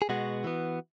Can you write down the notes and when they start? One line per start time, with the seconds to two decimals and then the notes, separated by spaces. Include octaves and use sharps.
0.02 G#4
0.09 B2 G#3 B3 F#4
0.44 E3 B3